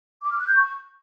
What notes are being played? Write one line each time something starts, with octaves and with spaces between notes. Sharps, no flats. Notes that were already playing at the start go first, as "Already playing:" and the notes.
D6
F6
F#6
G6
C#6